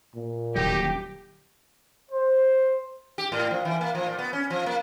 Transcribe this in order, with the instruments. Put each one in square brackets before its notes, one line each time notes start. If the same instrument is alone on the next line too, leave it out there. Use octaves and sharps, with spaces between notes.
[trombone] A#2
[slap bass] D#1 D3 F#3 [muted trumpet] D#4 [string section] G4
[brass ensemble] C5
[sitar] G4
A2
F3
E3
A#3
F3
A#2
B3
C#4
F3
A#3